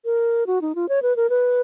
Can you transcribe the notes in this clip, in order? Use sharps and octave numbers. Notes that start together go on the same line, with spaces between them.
A#4
F#4
D#4
F4
C#5
B4
A#4
B4